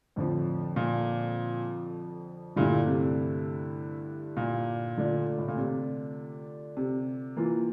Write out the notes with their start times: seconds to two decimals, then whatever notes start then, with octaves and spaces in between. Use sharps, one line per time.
0.16 F2 A2 D3 F3
0.76 A#2
2.56 G2 A#2 D3 A3 E4
2.87 C3
4.37 A#2
4.97 D3 A3 D4 F4
5.39 A2
5.48 A#2
5.57 C3
6.77 C3
7.36 E3 A#3 F4